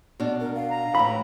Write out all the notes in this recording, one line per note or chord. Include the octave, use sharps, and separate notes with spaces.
B2 D4
A#4
F5
A#5
A2 E3 B5